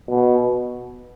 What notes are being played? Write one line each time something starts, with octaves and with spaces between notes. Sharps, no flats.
B2